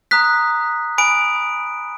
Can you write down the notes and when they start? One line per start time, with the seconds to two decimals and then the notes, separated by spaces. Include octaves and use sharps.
0.11 A#5 D#6 F#6 B6
0.98 G#5 B5 D#6 F#6 D7